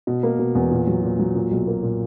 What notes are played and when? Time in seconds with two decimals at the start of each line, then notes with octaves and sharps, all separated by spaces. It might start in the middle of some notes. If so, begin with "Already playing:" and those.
0.07 B2
0.23 A#3
0.39 B2
0.55 E2
0.71 A#2
0.87 F#3
1.03 A#2
1.19 F#3
1.35 A#2
1.51 B1
1.67 A#3
1.83 A#2